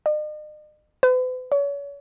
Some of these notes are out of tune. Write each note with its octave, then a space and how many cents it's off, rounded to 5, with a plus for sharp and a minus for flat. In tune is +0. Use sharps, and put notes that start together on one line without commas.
D#5 -45
B4 +45
C#5 +35